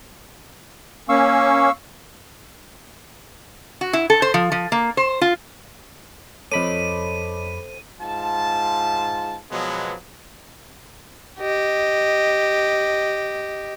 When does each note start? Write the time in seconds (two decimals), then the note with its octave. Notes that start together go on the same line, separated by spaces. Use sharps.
1.09 A#3 C#4 F5 C#6 E6
3.81 F#4
3.93 E4
4.10 A4
4.22 C5
4.34 F3
4.52 F3
4.72 A#3
4.97 C5
5.21 F4
6.52 F2 A4 C5 C#5 D#5 B5 D6 D#7
8.01 G#2 F4 A5
9.51 B2 F3 F#3 G#3 B3
11.39 G4 D#5